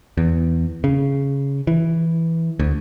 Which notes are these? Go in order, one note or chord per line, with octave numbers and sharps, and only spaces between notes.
E2
C#3
E3
D2